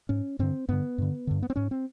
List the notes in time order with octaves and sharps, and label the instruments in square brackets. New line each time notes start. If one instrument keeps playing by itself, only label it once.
[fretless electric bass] G#2 C#4
G2 D3 C4
G2 D3 B3
G2 D3
G2 D3
B3
C4
G#2 C#4
C4